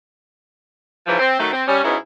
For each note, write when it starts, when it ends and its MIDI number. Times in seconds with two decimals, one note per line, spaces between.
1.07 1.18 44
1.07 1.18 49
1.07 1.18 52
1.07 1.18 53
1.19 1.39 60
1.39 1.52 51
1.39 1.52 54
1.39 1.52 57
1.52 1.63 60
1.67 1.80 55
1.67 1.80 61
1.82 1.96 44
1.82 1.96 47
1.82 1.96 59
1.82 1.96 61
1.82 1.96 64